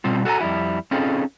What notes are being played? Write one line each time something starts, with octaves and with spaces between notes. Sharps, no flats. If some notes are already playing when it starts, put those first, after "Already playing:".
B2 G3 C4 F4
F#4 A4 C#5 G#5 A#5
F2 G3 E4
C4 C#4 D#4 F4 G#4 A4